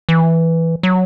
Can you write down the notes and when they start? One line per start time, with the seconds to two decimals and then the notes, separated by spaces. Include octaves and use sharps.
0.09 E3
0.83 F#3